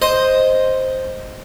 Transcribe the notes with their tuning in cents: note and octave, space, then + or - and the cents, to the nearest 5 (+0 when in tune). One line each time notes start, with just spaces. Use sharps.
C5 +0 D#5 +0